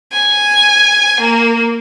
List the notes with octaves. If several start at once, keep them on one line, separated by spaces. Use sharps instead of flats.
G#5
A#3